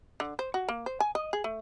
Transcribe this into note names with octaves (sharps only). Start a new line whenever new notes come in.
D3
C5
F#4
A#3
C5
G#5
D#5
G#4
A3